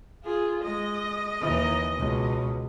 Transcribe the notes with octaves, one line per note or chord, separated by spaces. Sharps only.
F4 G#4
G#3 D#5
D#2 E3
C#2 B2